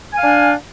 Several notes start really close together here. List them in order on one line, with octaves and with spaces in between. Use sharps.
G#5 F5 D4